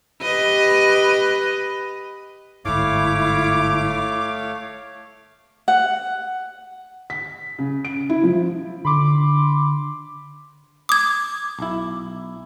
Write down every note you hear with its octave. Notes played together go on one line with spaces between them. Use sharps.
G4 B4 D#5
G1 G#2 A3 E4 C#5 F5 D6
F#5
B6
C#3
D7
E4
F3
D3 B5 C6 D6
D6 D#6 G#6
B1 E4